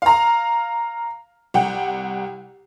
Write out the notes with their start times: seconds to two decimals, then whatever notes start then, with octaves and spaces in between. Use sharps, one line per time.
0.02 F5 A#5
1.54 C2 F#5 G5